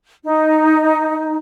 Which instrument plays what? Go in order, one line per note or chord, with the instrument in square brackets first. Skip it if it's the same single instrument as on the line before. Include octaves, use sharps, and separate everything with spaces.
[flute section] D#4